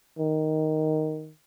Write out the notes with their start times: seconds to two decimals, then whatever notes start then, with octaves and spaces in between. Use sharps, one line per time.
0.19 D#3